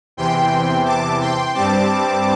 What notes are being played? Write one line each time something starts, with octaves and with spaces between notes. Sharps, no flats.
E2 C3 E3 G5 C6
A5 D6
G5 C6
G2 G3 C4 A5 D6